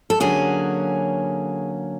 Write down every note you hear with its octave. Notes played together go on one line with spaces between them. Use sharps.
A4
D3 F#3 A#3 C#4 G#4